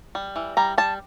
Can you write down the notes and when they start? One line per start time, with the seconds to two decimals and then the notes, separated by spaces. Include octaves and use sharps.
0.15 G3
0.36 E3
0.57 G3 A#5
0.78 G3 A5